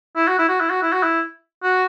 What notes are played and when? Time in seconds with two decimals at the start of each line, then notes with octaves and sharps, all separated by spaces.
0.16 E4
0.28 F#4
0.39 E4
0.49 F#4
0.61 E4
0.70 F#4
0.82 E4
0.93 F#4
1.03 E4
1.63 F#4